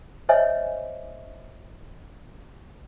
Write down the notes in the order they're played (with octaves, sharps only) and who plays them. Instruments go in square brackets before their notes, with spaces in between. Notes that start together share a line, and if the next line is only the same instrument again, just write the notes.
[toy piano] C5 C#5 D#5 E5 G#5